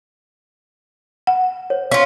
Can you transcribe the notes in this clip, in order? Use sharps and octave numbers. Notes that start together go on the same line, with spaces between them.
F#5
C5 C#5
C#4 F4 F5